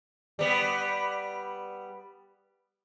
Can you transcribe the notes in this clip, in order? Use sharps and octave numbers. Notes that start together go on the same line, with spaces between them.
G3 B3